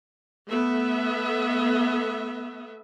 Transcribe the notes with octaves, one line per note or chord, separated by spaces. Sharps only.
A3 B3 E5